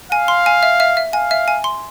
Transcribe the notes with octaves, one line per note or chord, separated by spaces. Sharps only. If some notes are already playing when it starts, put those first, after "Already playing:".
F5 G#5
C6
G#5
E5
E5
E5
F5 G#5
E5
G#5
C6